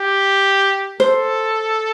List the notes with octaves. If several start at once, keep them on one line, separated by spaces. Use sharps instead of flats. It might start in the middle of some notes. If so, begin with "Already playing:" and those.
Already playing: G4
A4 C5